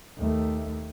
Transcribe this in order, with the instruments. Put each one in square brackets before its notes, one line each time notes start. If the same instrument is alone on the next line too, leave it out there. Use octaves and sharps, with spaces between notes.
[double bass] D#2 A3